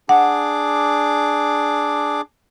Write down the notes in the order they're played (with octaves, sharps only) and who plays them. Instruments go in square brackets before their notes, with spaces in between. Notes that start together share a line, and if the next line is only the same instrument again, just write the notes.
[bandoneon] D4 G#4 D6 [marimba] F#5